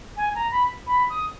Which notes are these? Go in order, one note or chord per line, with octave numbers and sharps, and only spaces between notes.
G#5
A#5
B5
B5
D#6